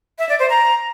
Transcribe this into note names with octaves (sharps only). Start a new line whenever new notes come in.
E5
D5
C5
A#5